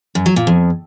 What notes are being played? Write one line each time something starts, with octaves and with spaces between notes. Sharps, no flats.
F#2
F#3
A#2
F2